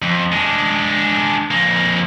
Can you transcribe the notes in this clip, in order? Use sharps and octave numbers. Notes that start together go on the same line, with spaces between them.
F2
G#3 D4
F2 A#3